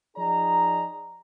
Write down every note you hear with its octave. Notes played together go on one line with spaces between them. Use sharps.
F3 D#4 G#4 D5 D#5 A#5